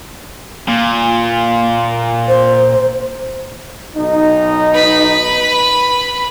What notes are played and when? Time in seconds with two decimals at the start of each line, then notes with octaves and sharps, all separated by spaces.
0.68 A#2
2.28 C5
3.95 B1 D#4
4.74 B4 B5